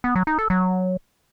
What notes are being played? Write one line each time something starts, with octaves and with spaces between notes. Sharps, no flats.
B3
F#3
D#4
A4
F#3